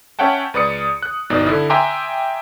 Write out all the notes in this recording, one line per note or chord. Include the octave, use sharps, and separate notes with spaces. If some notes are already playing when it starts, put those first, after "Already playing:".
C#4 C#5 E5 F#5 G5 A5
C#2 B4 D5 D#6 C#7
F#6
G1 B2 D#4 D5
D3 E4
E5 G5 G#5 A#5 C6 D6